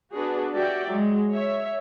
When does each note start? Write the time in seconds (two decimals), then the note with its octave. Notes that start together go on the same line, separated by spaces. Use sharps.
0.15 B3 D4 F#4 G#4 B4
0.53 F#4 G4 D5 E5 G5
0.90 F#3 G#3
1.34 C#5 E5